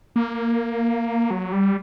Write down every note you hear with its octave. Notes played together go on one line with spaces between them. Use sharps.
A#3
F#3
G3